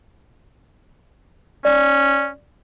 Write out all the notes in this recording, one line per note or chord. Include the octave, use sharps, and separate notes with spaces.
C#4 D5